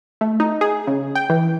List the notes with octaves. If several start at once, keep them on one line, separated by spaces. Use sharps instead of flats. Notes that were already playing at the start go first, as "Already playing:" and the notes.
A3
D#4
G#4
C#3
G5
E3